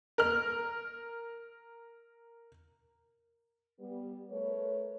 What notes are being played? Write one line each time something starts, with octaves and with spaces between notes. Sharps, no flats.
A#4 F6
G3 B3
A3 A#4 B4 C#5